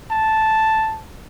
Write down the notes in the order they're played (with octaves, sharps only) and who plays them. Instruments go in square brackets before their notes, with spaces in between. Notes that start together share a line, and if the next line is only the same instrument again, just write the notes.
[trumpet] A5